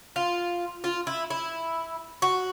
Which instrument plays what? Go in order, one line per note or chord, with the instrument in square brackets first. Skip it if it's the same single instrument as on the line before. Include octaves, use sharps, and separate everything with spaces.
[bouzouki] F4
F4
E4
E4
F#4